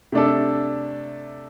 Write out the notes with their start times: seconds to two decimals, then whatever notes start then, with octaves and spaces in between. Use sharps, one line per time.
0.12 C3 A3 D4 A4